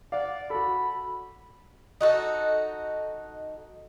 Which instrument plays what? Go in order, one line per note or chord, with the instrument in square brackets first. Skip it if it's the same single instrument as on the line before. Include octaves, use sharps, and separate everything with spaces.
[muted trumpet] D5 [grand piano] F5 F#5
[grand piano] F#4 A4 [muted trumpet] B5
[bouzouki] D#4 F#4 A4